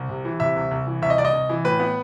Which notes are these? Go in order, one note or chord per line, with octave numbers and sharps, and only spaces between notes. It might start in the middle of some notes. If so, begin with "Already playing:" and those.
Already playing: C2
C3
E3
C3 E5
C2
C2
E3
C2 E5
D#5
C2 D5
D#5
C2
E3
A2 B4
B3